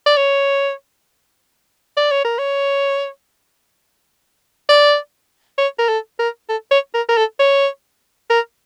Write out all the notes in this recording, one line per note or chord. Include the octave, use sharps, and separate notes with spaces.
D5
C#5
D5
C#5
A#4
C#5
D5
C#5
A#4
A4
A#4
A4
C#5
A#4
A#4
A4
C#5
A#4